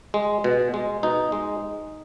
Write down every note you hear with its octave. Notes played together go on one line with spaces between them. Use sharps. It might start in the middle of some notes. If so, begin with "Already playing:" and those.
G#3
B2
G#3
B2 D#4
G#3